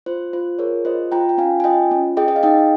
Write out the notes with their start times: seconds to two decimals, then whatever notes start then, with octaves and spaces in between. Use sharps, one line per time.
0.06 F4 C5
0.33 F4 C5
0.59 G#4 A#4 C#5
0.85 F4 C5 D#5
1.12 F4 G5 A#5
1.29 G5
1.38 C#4 F5 G#5
1.60 G#5
1.64 F4 D#5 G5
1.91 C#4
2.17 G#4 D#5 G5
2.28 D#5
2.36 F5
2.43 D#4 D#5 G5